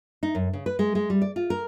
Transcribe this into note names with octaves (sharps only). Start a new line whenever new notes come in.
D#4
F#2
C#3
B4
G#3
G#3
G3
D5
F4
A#4